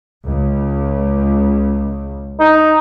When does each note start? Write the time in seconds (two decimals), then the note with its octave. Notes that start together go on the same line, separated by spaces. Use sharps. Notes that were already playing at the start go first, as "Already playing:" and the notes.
0.26 C#2
2.40 D#4